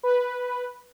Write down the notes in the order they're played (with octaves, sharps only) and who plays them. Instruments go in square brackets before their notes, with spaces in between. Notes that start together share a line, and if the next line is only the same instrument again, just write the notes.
[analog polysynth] B4